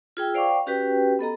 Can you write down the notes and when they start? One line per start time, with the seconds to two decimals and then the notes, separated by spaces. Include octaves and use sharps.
0.17 F4 G#4 G5 E6
0.34 C5 D5 F5 G5 C#6 D6
0.67 C#4 F#4 G4 B4 G5
1.19 B3 A4 D#5 A#5